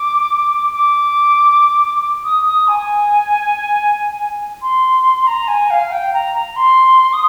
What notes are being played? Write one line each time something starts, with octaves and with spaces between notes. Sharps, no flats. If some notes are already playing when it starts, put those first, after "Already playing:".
Already playing: D6
D6
D#6
D#6
G#5
C6
A#5
G#5
F5
G5
A#5
A#5
C6
D#6